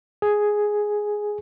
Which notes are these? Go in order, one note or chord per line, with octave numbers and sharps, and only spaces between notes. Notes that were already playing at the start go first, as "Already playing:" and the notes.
G#4